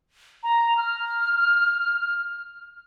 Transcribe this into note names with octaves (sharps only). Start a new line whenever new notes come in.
A#5
F6